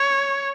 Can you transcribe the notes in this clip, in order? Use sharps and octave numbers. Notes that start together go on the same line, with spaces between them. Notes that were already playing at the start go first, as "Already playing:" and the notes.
Already playing: C#5